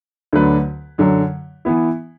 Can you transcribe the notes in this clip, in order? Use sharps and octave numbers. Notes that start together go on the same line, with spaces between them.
D2 D3 F#3 D4 B4
F#2 D3 F#3
E3 B3 E4